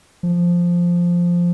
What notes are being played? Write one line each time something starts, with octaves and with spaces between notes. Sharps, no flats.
F3